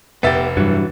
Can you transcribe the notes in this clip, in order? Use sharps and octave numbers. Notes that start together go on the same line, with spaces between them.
F1 B3 G4 E5 A6
G2 E3 F#3